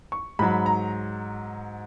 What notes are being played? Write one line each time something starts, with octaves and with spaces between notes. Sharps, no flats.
C#6
G#2 F#3 B5
A#5